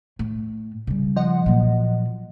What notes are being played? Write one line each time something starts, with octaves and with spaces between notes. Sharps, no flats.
A2
C#3 G3
F3 D#5 F#5
A#2 F#3